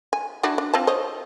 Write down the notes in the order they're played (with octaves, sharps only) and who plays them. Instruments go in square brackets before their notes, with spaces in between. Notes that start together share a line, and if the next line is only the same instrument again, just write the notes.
[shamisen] G#5
D4 E4 F#4
D4
C4 F4 A5
C5 C#5 D#5